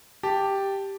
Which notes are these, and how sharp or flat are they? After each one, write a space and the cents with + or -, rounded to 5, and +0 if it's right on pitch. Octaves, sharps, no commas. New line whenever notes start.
G4 +0 A5 +0